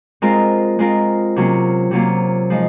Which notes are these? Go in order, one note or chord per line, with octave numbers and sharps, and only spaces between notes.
G#3 C4 F4 A#4
G#3 C4 F4 A#4
C3 F#3 A#3 C#4 F4
C3 F#3 A#3 C#4 F4
F3 G#3 D#4